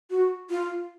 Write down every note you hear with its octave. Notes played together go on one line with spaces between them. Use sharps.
F#4
F4